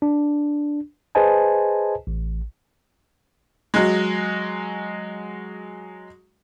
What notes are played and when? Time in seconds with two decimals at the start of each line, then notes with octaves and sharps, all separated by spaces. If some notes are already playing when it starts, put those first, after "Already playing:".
0.02 D4
1.15 G#4 B4 C5 D#5 G#5 A5
2.07 A1
3.74 F#3 G#3